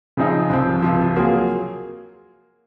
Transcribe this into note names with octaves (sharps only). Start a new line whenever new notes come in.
C#3 F3 C4 D#4 G#4
C2 C3 F3 C4
C#2 C3 F3
F#3 A#3 F4 G#4